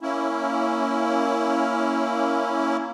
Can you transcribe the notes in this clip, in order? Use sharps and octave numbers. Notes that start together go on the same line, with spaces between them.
A#3 C#4 E4